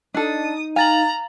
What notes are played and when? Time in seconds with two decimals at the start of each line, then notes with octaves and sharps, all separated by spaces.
0.14 D4 D#4 A4 D#6
0.76 F5 G#5 A#5 A6 F#7